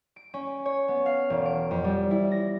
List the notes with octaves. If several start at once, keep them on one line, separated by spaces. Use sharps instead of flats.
D7
C#4
C#5
B3
F5
E1
D7
F2
G3
E4
A#6